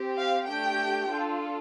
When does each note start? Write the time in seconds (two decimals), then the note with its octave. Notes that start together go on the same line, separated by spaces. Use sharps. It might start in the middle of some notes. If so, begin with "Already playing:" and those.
Already playing: C4 G4
0.17 F5
0.47 A3 D4 G4 G5
1.09 D4 F4 A4